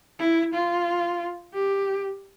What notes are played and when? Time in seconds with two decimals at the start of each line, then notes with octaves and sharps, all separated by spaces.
0.19 E4
0.54 F4
1.54 G4